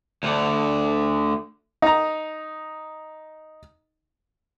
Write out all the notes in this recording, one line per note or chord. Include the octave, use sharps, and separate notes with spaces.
D2 D3
D#4 A#5